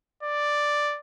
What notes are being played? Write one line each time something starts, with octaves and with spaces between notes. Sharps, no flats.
D5